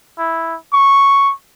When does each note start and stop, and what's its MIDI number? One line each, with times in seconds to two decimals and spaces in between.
0.19 0.56 64
0.73 1.33 85